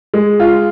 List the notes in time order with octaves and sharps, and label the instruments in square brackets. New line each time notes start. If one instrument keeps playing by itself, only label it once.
[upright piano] G#3
F4